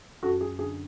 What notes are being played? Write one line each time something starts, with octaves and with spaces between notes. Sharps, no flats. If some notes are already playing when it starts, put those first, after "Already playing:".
F#2 F#4 A4
G#4
D3 G#4